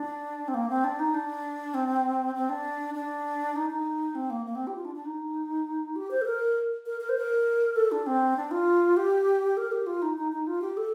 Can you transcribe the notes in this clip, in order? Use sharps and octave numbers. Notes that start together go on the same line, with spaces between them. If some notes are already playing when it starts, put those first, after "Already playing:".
Already playing: D4
C4
A#3
C4
D4
D#4
D4
C4
C4
D4
D4
D#4
D#4
C4
A#3
A#3
C4
G4
F4
D4
D4
D#4
G4
C5
A4
A#4
A#4
A#4
C5
A#4
A4
D4
C4
D4
F4
G4
A#4
G4
F4
D#4
D#4
D#4
F4
G4
A4